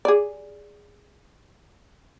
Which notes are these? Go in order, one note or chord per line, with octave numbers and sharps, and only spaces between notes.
G#4 D5